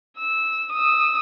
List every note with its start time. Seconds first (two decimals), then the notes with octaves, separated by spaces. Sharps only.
0.19 E6
0.72 D#6 E6